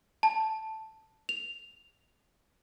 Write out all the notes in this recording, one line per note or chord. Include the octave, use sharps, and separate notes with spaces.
A5
F7